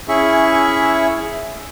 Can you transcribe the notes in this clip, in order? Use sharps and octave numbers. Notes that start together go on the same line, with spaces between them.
C#4 E4 G#4 E5 C#6